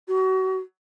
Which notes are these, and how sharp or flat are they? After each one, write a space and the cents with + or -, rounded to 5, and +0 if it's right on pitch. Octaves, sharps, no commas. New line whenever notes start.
F#4 +30